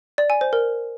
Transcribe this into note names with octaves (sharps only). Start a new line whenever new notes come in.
D5
G#5
C5
A#4